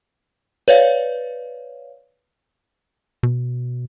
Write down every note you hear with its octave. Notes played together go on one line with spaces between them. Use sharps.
B4 C#5 D5 F5
B2